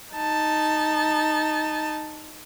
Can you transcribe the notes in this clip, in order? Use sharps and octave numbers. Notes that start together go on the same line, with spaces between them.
D#4 A5